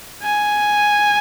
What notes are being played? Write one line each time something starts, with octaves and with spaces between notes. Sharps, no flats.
G#5